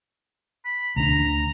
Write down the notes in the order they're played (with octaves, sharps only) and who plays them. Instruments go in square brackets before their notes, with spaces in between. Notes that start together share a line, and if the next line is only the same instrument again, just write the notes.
[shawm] B5
[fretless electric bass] D2 D3 D4 [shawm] A#5